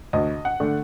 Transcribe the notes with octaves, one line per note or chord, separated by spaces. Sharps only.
D2 D#5
F#5
D3 A3 D4